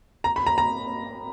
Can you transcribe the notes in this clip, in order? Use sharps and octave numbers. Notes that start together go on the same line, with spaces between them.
A#5
B5
A#5
A#5